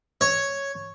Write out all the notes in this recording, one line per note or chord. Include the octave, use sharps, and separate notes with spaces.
C#5